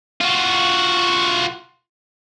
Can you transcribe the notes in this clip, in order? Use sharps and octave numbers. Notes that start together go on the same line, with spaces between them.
F4 F#4